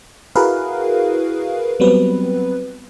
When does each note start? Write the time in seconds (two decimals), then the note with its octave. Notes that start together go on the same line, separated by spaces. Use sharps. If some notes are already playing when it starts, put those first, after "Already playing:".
0.35 E4 F#4 G#4 A#4 B4 F5
1.80 F#3 G3 B3 C4 B4